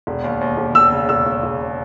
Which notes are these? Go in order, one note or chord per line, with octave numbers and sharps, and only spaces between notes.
E1
D#2
D#2
E1
E1 E6
C#3
E1 E6
E1
E1